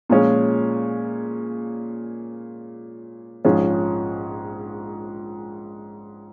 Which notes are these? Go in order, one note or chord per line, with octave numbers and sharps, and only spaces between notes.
A#2 F3 G#3 C#4
A#1 G#2 F3 C#4 G#4